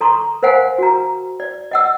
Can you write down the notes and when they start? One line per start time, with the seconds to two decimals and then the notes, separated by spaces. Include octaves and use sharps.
0.01 A4 A#5 C6 C#6
0.43 A#4 C5 F5 F#5 G#5
0.78 F#4 A#5
1.40 D5
1.71 D#5 F#5 E6